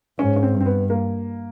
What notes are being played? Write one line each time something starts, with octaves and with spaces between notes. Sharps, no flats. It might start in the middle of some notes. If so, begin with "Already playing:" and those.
G#2 C#4
C#4
C4
G2
C4
B3
A#3